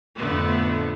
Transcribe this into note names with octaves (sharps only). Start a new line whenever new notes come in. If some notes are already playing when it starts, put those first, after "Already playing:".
F2 A2 D3 A3 B3